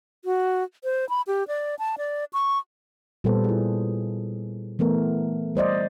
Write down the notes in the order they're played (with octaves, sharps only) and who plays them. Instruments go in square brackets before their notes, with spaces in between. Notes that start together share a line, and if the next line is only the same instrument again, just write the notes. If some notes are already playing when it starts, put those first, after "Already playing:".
[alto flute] F#4
C5
B5
G4
D5
A5
D5
C#6
[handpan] A#2 G3 B3 A4 B4 C5
E4 G#4
E3 A3 B3 A#4
G3 C5 D5 D#5